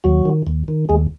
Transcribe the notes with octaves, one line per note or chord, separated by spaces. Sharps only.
D#2 F#3 F#4
D#3
D#2
D#3
D#2 G#3 G#4